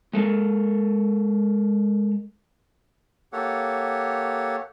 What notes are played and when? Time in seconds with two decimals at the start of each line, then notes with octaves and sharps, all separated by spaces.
0.13 G#3 A4 A#4
3.33 A#3 G4 A4 C#5 F#5